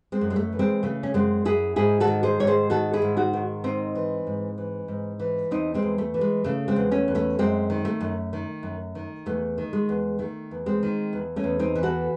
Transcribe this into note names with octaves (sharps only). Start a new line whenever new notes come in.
G#3 C4
F#2
G#3
A3
E3
G#3 C4
C#3 A3
C#4
F#2 G#3 C4
F#2 E4 G#4
G#2 E4 G#4
F#4 A4
D#3
G#4 C5
G#2 C#5
G#4 C5
D#3 F#4 A4
E4 G#4
G#2
D#4 F#4
D#3
G#2 C4 D#4
E3
G#2
E3
G#2
E3
E2 C4 D#4
G#3 C4
E2
A3
E3
G#3
C#3 A3
G#3 C4
E2
A3 C#4
E2
A3 C#4
F#2 G#3 C4
D#3
A3
F#2
D#3
F#2
D#3
E2 A3
D#3
G#3
E2
D#3 A3
E2
G#3 C4
D#3
E2
A3 C#4
E2
C4 D#4
E3
F#4 A4